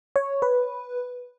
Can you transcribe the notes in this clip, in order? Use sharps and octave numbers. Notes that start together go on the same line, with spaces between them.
C#5
B4